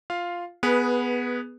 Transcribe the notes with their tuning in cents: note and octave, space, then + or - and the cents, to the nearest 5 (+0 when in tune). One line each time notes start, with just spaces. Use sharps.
F4 +0 F5 +0
B3 +0 G#4 +0 B4 -20